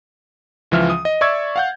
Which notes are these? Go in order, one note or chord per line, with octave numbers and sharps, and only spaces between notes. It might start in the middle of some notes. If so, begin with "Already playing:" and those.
C#2 E3 F3 E5 F6
D#6
D#5
D5 E5 C#6 E6 G#6 A6
F5 F#5 G6